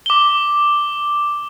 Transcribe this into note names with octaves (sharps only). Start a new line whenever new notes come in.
D6 G7